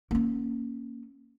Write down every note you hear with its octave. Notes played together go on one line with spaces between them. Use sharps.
A#3 C#4